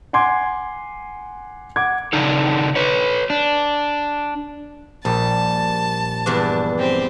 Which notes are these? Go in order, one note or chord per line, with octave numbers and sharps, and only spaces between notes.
F#5 G#5 C6 D6 G#6
F#5 D6 G#6
C#3 D4 D#4 A4
B4 C#5
D4
A#1 G3 A5
E2 G2 D4
C4 G4